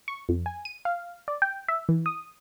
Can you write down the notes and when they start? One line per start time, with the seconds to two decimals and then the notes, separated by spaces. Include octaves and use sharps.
0.08 C#6
0.29 F2
0.46 G#5
0.65 D#7
0.85 F5
1.28 D5
1.42 G5
1.68 E5
1.89 E3
2.06 D#6